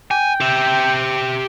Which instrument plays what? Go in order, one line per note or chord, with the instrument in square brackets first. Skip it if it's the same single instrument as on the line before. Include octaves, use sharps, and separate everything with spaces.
[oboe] G5 [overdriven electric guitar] G#5
[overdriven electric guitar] G4 E5